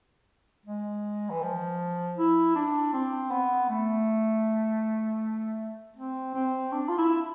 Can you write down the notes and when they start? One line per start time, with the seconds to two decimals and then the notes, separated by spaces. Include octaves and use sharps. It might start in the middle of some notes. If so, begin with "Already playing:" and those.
0.66 G#3
1.30 E3
1.42 F3
2.17 E4
2.55 D4
2.93 C4
3.31 B3
3.70 A3
5.96 C4
6.34 C4
6.72 D4
6.89 F4
6.98 E4